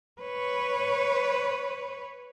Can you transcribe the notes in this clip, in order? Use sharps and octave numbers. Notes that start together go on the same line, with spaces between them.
B4 C#5